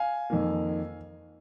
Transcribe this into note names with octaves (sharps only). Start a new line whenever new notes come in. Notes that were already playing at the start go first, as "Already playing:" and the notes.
Already playing: F5 G#5
F2 D#3 A#3